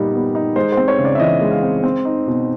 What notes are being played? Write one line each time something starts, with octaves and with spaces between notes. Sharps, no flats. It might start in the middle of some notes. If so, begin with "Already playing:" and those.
Already playing: A#2 G3 B3 D#4
B3
D#4
G#3 C5
C4 C5
C#5
C#3
D5
E5
E3 D#5
G#3
F5
C4
C4
D#4
B2